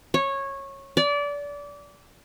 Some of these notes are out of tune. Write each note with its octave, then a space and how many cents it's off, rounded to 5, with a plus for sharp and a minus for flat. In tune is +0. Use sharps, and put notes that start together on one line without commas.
C#5 -15
D5 -25